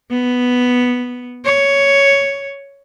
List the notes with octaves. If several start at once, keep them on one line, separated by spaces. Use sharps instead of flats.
B3
C#5